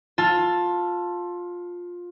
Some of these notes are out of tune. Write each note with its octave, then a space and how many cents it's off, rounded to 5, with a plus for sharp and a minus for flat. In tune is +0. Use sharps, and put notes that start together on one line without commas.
F4 +15 A5 +0 E6 +45